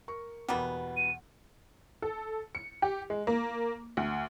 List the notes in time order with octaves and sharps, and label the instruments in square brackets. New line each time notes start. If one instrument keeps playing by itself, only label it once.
[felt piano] A#4 C#6
[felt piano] E2 B2 [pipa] G3 A#3 B3 [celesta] F#5
[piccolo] D#7
[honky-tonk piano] A4
C#7
G4
G#3
A#3
D2